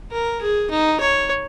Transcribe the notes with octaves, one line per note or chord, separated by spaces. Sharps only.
A#4
G#4
D#4
C#5